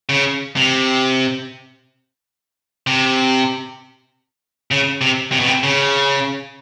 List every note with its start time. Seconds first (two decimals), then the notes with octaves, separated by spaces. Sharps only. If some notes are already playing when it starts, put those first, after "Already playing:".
0.09 C#3
0.56 C3
2.87 C3
4.71 C#3
5.01 C3
5.32 C3
5.40 B2
5.46 C3
5.63 C#3